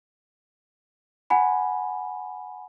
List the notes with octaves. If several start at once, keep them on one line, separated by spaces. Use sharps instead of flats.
F#5 G#5 B5